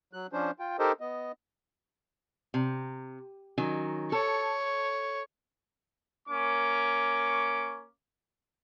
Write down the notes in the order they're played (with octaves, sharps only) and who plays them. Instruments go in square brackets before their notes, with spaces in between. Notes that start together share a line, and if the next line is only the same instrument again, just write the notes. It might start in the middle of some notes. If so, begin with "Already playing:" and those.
[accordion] F#3 F#6
F3 C#4 D4 C5
F4 G5
D#4 G4 A4 A#4 C5 D#5
B3 D#5
[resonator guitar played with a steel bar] C3
D#3 F#3 C#4
[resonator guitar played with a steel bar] A4 [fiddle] C#5
[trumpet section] A#3 C#4 C#6 D6